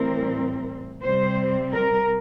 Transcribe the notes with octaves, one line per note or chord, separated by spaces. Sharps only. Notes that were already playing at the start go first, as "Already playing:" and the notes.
Already playing: A2 E3 G3 C4 A#4
C3 G3 C4 C5
A#4